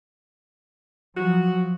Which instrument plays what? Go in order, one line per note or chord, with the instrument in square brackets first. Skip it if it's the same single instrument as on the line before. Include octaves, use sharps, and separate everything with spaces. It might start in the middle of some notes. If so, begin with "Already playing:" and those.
[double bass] F3 F#3 [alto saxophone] F#4